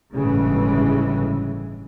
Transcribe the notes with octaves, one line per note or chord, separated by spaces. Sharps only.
G1 A2 C#3 E3 G#3